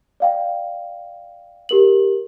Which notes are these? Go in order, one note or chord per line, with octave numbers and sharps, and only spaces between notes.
D5 F5 G5
G4 A#4 F#7